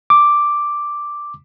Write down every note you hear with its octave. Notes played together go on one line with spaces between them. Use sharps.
D6